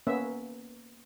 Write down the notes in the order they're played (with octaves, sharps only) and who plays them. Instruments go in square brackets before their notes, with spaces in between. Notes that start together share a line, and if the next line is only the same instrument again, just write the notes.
[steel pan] A#3 B3 C#4 E5